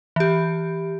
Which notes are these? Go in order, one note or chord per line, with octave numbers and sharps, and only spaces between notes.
E3 G4